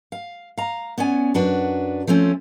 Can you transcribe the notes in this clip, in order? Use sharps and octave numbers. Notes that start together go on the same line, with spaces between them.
F5
F5 A#5
B3 C#4 D5 G#5
F#2 D4 F#4 B4
F3 A3 C4 C#4